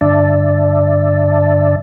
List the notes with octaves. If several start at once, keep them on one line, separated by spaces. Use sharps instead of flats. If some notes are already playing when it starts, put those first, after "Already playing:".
G2 D3 D5 E5 A5